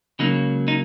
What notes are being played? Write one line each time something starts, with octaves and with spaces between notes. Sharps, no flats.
C#2 C#3 F#3 A#3 D#4
D#4